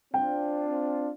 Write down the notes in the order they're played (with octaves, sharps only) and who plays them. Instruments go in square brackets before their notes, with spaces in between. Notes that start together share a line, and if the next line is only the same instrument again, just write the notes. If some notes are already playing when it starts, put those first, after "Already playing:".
[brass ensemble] C4 D4 F4 [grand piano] G5